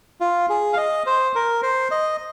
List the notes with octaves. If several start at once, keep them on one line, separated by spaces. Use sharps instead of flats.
F4
G#4
F5
D#5
C5
A#4
C5
D#5